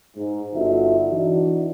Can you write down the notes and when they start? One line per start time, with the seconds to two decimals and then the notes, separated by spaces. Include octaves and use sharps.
0.16 G#2
0.54 G1 D3 D#4 F4 F#4 E5
1.11 E3 D4 D#4 F#4